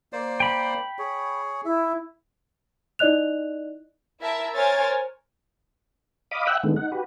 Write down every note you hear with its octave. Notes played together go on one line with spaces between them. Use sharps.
A#3 C5 D5
G5 B5
G#4 C#5
E4 E5
D#4 E4 D5 D#5 F#6 F7
E4 A#4 E5 A5
A#4 C5 C#5 G#5 F6 A6
D#5 F5 B5 D6 D#6
E5 F#5 G5 E6 F#6
D3 D#3 G#3 A3 B3
D#4 F#5
F#4 G4 B4